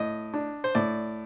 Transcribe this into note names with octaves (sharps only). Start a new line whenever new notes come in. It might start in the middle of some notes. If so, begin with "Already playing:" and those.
Already playing: A2 D#5
D4
C5
A2 D5